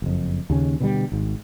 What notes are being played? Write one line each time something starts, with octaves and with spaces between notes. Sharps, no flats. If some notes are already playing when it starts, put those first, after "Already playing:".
F#1 F2
D#2 C#3 C#4
B2 D3 G3
G#1 G#2